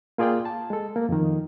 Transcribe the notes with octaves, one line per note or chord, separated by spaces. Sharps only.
A#3 F4 G#4 D5 F5 G5
A5
G#3 A4
A#3
F2 D#3